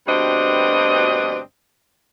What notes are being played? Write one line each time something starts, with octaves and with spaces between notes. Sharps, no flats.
D2 G2 B2 C4 D4 D#5